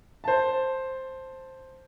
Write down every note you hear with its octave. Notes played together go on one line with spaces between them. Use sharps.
C5 A5